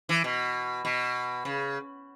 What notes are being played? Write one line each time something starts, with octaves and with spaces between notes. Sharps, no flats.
E3
B2
B2
C#3